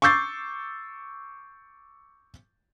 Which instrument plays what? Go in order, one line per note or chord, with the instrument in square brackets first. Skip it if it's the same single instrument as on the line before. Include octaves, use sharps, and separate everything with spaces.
[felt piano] C#6 D6 E6 G6 A6 C7